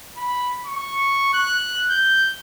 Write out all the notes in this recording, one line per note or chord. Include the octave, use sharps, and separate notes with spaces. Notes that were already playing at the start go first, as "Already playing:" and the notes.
B5
C#6
F#6
G6